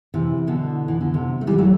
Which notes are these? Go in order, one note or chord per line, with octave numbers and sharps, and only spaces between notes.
C3 E3
B2 D3
E3
D3
C3
A3
E3 G3
F#3 A3